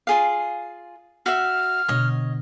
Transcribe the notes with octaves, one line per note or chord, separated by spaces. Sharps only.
F4 G#4 F5
F#4 E5 F6
B2 D3 C#5 D#5